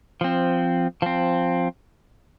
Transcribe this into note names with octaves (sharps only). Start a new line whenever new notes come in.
F3 C4
F3 C4